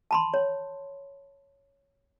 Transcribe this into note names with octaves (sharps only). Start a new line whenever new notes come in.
A5 B5 C6
C#5